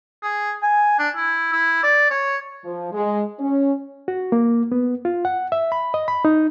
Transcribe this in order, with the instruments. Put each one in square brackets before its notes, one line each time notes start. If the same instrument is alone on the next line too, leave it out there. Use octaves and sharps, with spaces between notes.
[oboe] G#4
G#5
D4
E4
E4
D5
C#5
[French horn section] F3
G#3
C#4
[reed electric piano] F#4
A#3
B3
F4
F#5
E5
B5
D#5
B5
D#4